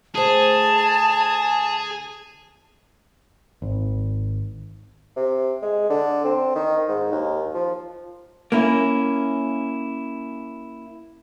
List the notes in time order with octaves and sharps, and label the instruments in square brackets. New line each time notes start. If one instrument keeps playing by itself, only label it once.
[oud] D2 C5 [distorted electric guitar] G#4 [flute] A5
[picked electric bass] G#1
[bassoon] C3
G#3
D3
C4
D#3
G#2
D#2
F3
[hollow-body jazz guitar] A#3 C#4 E4